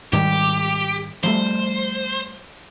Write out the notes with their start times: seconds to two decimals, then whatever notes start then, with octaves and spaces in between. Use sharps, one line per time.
0.13 G#2 D#3 G3 G4
1.24 F3 G3 A3 C5